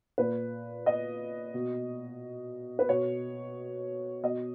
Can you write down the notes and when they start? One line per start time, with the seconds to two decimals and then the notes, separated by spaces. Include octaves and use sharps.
0.18 A#2 B4
0.86 D#5
1.54 B2
2.79 B4
2.89 B2 C#5
4.23 B2 D#5